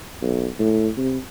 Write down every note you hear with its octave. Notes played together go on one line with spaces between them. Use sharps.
B1
A2
C3